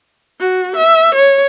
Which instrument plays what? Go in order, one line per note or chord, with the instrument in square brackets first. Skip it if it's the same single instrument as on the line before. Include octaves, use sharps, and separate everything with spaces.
[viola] F#4
E5
C#5